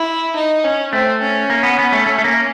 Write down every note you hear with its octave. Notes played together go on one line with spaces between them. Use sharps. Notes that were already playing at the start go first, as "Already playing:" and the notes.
Already playing: E4
D#4
C#4
A3 C4
C#4
A#3
B3
B3
A3
A3
A3
A#3